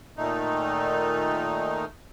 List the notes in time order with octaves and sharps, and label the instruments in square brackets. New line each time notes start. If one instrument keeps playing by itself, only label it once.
[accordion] A#2 D#3 A3 D#4